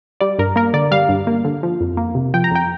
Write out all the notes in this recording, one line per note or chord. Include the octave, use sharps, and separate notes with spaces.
G3 D5
G2 A#4
A#3 A#4
D3 D5
G3 F5
G2
A#3
D3
F3
F2
A#3
C3
F3 G5
A#5
F2 G5